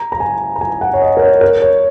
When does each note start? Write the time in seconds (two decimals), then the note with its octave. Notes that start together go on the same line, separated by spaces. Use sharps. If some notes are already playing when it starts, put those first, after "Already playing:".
Already playing: A#5
0.12 A#5
0.20 G#5
0.56 A#5
0.61 G#5
0.81 F#5
0.93 C#5
1.02 D#5
1.17 A#4
1.22 C#5
1.41 A#4
1.62 C#5